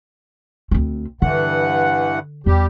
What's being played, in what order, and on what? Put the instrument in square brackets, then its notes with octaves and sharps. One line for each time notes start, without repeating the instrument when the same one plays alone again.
[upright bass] D2 C4
[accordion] G2 E3 F#5 [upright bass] D3
[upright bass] E2 [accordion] G3 G4